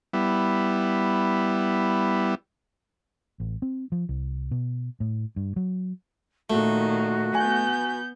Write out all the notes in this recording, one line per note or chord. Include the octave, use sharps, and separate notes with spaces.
G3 B3 E4
A1
C4
F3
C2
B2
A2
G2
F#3
A#2 D#3 A3 F#4
B3 G#5 G6